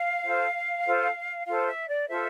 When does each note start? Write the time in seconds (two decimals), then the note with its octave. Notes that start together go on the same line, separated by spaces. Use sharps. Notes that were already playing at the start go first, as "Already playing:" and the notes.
Already playing: F5
0.25 F4 A4 C5
0.86 F4 A4 C5
1.47 F4 A4 C5 F5
1.68 E5
1.88 D5
2.08 F4 A4 C5 E5